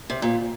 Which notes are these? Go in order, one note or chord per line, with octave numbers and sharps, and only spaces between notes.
C3
A#2